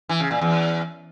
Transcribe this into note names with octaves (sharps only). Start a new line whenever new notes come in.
E3
C#3
A#2
E2